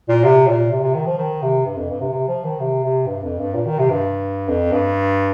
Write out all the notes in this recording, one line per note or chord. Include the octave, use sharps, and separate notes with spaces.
A#2
C3
A#2
C3
C3
D#3
F3
D#3
C3
G2
F2
G2
C3
C3
F3
D#3
C3
C3
G2
F2
G2
A#2
D#3
C3
G2
F2
G2